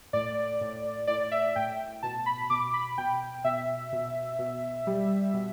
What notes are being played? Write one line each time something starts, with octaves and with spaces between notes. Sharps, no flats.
A2 D5
A2
A2 D5
E5
A2 G5
B2 A5
B5
B2 D6
B5
B2 G5
B2 E5
B2
B2
G3
B2